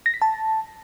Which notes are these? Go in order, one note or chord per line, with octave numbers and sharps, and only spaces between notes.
A#6
B6
A5